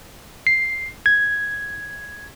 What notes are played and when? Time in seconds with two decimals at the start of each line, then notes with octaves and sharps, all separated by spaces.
0.47 C7
1.06 G#6